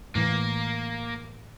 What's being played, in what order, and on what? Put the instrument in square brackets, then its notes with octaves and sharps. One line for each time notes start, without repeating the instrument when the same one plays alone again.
[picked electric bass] A2 E3 [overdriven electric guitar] A#3